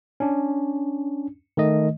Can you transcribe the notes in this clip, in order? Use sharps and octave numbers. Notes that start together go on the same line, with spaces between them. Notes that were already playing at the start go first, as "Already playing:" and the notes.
C#4 D4
D#3 A3 D#5